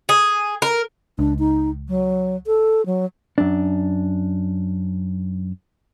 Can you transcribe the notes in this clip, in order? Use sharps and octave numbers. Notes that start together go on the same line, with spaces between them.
G#4
A#4
C#2 D4
D#4
F#3
A4
F#3
F#2 D4